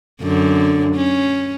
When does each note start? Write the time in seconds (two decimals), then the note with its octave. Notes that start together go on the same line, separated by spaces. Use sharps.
0.22 F#2 D3
0.95 C#4